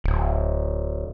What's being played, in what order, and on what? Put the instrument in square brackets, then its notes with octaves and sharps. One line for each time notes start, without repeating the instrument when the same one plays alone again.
[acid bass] D1